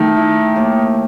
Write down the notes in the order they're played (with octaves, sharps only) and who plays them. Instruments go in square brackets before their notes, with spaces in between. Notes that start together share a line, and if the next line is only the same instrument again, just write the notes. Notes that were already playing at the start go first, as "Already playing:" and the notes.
Already playing: [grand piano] D#3 [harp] A3
[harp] E4
D#2